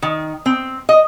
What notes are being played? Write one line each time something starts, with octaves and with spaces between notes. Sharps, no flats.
D#3
C4
D#5